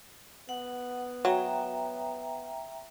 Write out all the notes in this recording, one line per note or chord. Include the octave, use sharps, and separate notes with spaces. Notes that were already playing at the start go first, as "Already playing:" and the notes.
B3 F#5
F#3 E5 G5 A#5